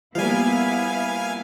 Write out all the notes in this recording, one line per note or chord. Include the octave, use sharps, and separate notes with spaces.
F3 G3 A#3 B3 E4 F5 G#5